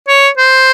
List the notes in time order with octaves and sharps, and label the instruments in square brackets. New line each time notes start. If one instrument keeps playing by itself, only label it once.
[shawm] C#5
C5